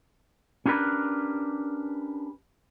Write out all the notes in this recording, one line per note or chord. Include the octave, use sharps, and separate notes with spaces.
C#4 D4 G4 A#4 B4